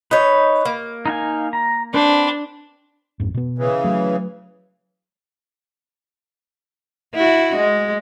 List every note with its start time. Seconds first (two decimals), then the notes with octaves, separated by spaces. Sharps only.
0.11 D#4 B4 C#5
0.65 A#3
1.06 D#4 F5 G#5
1.53 A#5
1.94 C4 D4 B4 C5
3.20 A1 F2 G#2
3.34 B2 B3
3.58 C#3 E3
3.84 F#3 A3
7.15 E4 F#4
7.56 G#3